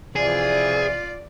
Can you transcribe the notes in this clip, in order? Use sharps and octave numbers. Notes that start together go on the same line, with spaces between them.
C3 E3 F3 F4 G#4 D5